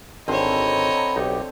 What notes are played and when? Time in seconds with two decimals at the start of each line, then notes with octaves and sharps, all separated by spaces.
0.28 G#1 D3 C4 C#5 D#5 F5 A#5 B5
1.16 B1 D#4 G4